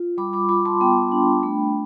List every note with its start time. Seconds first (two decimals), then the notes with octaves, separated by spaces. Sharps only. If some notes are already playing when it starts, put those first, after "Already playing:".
Already playing: F4
0.18 G3 B5 D6
0.33 B5 D6
0.49 F4 B5 D6
0.65 A5 C6
0.81 B3 G5 B5
1.12 D4
1.43 A3